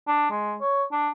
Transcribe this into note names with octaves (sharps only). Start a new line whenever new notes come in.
D4
G#3
C#5
D4